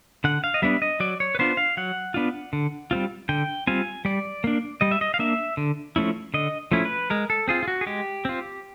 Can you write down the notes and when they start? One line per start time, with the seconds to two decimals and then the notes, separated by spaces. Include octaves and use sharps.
0.24 D3 F#5
0.44 F5
0.54 D#5
0.62 G3 B3 D4 E5
0.82 D#5
1.00 F#3 D5
1.20 C#5
1.35 B4
1.39 B3 D4 F4 C5
1.57 F5
1.77 F#3 F#5
2.14 B3 D4 F4
2.53 D3
2.91 G3 C4 F4
3.29 D3 G5
3.67 G3 C4 F4 G#5
4.05 G3 D5
4.44 A#3 D4
4.81 G3 D#5
4.91 E5
5.01 D#5
5.14 F5
5.19 A#3 D4 E5
5.57 D3
5.96 F3 A3 C#4 E4
6.34 D3 D#5
6.72 F3 A3 C#4 E4
6.85 B4
7.10 G#3 A#4
7.30 A4
7.48 C4 F4 G#4
7.63 F4
7.68 F#4
7.81 G#4
7.87 G#3 G4
8.25 C4 F4